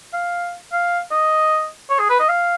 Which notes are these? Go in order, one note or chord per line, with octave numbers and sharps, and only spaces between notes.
F5
F5
D#5
C#5
G#4
B4
D#5
F5